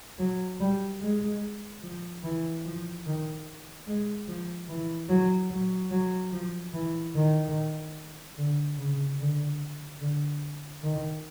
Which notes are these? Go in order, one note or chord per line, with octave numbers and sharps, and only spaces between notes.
F#3
G3
G#3
F3
E3
F3
D#3
G#3
F3
E3
F#3
F#3
F#3
F3
E3
D#3
D3
C#3
D3
D3
D#3